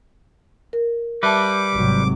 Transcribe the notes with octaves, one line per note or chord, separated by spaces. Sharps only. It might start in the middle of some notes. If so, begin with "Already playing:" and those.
A#4
G3 B4 E5 A5 D6
G#1 C3 F#3